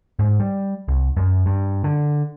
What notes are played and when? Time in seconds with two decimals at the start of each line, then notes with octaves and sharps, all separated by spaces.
0.19 G#2
0.40 G3
0.88 C2
1.17 F#2
1.46 G2
1.84 D3